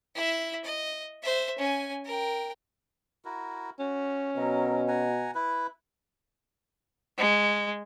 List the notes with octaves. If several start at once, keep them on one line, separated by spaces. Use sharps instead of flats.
E4 E5
D#5
C5 E5
C#4 G#5
A#4 G5
E4 F#4 A#4
C#4 F#4
B2 F#3 A#4
F#5 G#5 A#5
E4 B4
G#3